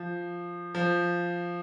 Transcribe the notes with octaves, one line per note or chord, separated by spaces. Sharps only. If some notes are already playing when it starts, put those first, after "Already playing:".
Already playing: F3
F3